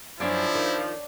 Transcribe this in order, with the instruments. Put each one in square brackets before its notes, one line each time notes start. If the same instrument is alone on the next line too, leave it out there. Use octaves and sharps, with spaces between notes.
[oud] F#2 [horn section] F3 [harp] D4 C#5 D5 [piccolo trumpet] E4
[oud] D#3